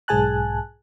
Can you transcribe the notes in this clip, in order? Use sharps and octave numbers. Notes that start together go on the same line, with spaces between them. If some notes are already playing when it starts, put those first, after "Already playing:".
B1 G#2 G#4 G#5 A5 F#6